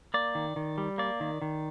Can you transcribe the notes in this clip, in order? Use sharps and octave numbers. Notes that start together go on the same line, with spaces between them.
A#3 D5
D#3
D#3
G3
A#3 D5
D#3
D#3